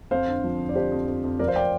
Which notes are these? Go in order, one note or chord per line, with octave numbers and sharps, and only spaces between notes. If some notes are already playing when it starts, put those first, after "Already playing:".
F2 C5 F5
D3
F3
D3
D5
D3 G4 C5
F2
F2
F2
F3 A#4 D5
C5 F5
D5 G5